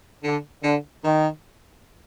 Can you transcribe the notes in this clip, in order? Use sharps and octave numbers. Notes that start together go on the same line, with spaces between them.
D3
D3
D#3